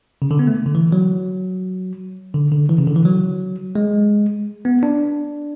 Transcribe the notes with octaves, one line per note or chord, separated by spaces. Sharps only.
C#3
D3
B3
A3
D3
E3
F#3
D3
D3
E3
C#3
D3
E3
F#3
G#3
B3
D4